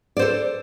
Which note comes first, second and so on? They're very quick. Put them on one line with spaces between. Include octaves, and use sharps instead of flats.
D5 C5 A4